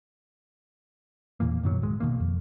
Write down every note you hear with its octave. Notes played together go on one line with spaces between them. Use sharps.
E2 A#2 E3 A#3
F#2 B2 D#3 F#3
D1 G#3
B2 D#3 A#3
F2